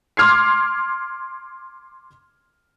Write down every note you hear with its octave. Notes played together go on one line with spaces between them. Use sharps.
C6 D6 F6 G#6 C7